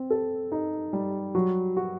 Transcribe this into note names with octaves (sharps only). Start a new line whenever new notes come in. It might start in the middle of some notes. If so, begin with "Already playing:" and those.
Already playing: C4
A4
D#4
G3
F#3
F#4